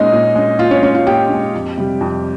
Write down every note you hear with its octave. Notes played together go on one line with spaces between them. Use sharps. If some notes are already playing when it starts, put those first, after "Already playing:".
Already playing: A#2 G#3 C#4 D#4 D#5
A#2
G#3 C#4
A#2 F4 F5
C#4 C#5
G#3 C#4 C#5
F4 F5
A#2 G4 G5
G#3 C#4
F2
C3 G3
F2